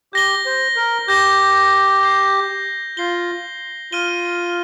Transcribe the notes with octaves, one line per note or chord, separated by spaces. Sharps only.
G4 G6 A#6 G7
C5
A#4
G4 G6 A#6 G7
G6 C7 G7
F4 G6 C7 G7
F4 F6 D#7 G7